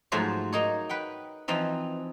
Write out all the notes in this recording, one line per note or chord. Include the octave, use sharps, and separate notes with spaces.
G#2 F3 F#3 A3 C5 C#5
A#3 D#4 C#5
B4 F#5 G5
E3 F3 C4 D#4